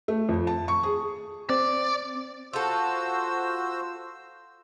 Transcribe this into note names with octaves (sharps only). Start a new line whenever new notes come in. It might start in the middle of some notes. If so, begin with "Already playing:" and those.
A3
F2
A5
C#6
G#4
C4 D5
F4 F#4 A4 C5 E6